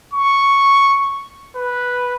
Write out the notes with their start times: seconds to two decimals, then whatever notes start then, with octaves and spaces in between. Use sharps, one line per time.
0.13 C#6
1.56 B4